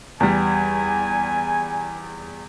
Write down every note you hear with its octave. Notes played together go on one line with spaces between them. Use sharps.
E2 G3 G#5